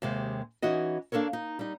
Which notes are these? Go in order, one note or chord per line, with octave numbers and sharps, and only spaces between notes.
D#2 C3 G#3
E3 C#4 D#4 F#4 D#5
A#3 D4 A4 A#4 C#5
D#4
G3 D#4